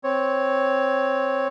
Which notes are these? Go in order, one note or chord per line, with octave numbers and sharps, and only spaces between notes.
C4 C#5